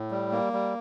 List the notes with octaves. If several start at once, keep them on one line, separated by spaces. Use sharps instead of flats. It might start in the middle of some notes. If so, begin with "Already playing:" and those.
Already playing: A2
G3
A#3
G3